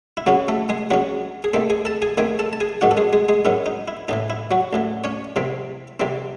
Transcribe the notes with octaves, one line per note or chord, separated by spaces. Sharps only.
E4
D#2 C#3 F#3 C#4 F#4
A3 A4
G#3 G#4
D#2 C#3 F#3 C#4 F#4
G#4
D#2 D#3 A3 C4 A4
G#4 G#5
A4 A5
G#4 G#5
D#2 D#3 A3 C4 G#4 G#5
A4 A5
A5
G#4 G#5
G#2 D#3 F#3 C#4 F#4 F#5
A4
G#3 G#4
G#3 G#4
G#3 G#4
G#2 D#3 F#3 C#4 E4
D#4
E4
A1 A2 E3 D#4
E4
F#3 F#4
A1 A2 E3
C#4 C#5
C2 C3 E3 C4
C2 C3 E3 C4